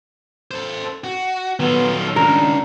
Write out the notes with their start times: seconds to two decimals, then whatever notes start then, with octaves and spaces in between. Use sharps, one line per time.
0.51 A4 C5
1.04 F#4
1.60 D#3 F#3 B3 F4 A4
2.16 C#2 D4 A#4